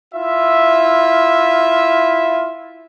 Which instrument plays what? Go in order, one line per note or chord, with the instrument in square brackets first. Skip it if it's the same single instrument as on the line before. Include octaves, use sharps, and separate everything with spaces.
[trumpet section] E4 F4 E5